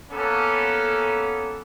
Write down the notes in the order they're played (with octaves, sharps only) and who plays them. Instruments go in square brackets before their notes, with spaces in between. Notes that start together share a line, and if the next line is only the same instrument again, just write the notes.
[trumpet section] A#3 B3 C#4 A4